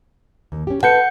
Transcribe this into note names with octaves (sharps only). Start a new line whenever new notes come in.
D#2
C#4 G4
A4 B4 F#5 A5 G6 C#7